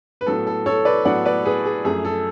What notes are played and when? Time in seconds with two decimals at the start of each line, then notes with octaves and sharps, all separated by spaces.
0.21 B4
0.26 A2 F#3 B3 A4
0.47 A4
0.66 A4 C#5
0.85 B4 D5
1.05 A2 F#3 B3 D5 F#5
1.25 B4 D5
1.46 G#4 B4
1.65 G#4
1.85 F#2 F3 A3 G#4
2.05 A4